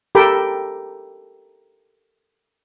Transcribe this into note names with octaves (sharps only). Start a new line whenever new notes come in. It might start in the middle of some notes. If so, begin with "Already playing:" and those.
G4 A4 A#4 G5 B5